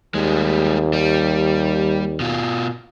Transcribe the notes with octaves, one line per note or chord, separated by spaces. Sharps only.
D#2 G3 G#3
G3
B2 F4